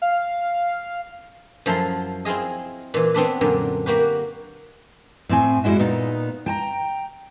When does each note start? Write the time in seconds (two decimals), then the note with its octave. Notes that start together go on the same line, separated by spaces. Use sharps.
0.02 F5
1.66 F#2 F3 E4 A4 C6
2.25 C4 E4 F4 G#4 D#5
2.94 A#2 E3
3.14 B3 C4 D4 B4
3.41 F#2 A#2 D3
3.86 A#3 F#4 G4 B4
5.29 A2 C4 G#5
5.64 G3 G#3 D4 E4 F#4
5.79 A#2 B3 D#4
6.46 G5 A5 A#5